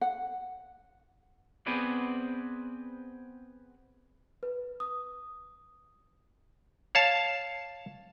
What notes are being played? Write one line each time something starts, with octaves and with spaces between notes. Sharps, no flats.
F#5
B3 C4 G#4 B4 C5 D5
B4
D#6
C#5 F5 A5